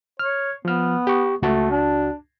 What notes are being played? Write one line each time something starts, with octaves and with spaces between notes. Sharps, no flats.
C#5 F6
F3 B3 F6
G4 C#6
C#2 A3 F#4 A5
D4